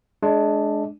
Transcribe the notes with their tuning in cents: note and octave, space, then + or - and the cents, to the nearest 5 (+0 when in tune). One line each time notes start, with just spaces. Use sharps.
G#3 +25 D4 +0